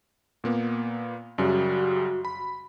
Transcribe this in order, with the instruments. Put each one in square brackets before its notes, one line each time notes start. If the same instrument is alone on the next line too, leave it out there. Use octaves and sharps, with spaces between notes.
[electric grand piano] A#2 A#3 B3
[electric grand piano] F#2 C#3 G3 [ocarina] F#4
[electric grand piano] B5